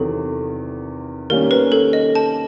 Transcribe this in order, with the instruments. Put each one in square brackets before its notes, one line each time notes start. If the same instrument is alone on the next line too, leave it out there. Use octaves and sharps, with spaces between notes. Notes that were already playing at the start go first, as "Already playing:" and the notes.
Already playing: [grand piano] E2 C3 D#3 F#3 [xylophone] A4
[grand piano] D#3 G3 A#3 C#4 [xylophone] A#4
[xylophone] B4
A4
D#5
A5